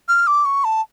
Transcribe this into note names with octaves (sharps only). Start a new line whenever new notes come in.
F6
D6
C#6
A5